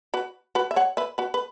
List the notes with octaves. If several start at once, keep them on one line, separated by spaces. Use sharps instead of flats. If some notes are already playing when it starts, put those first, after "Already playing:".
F#4 B4
F#4 B4
E5
C#5 F#5
B4 E5
F#4 B4
B4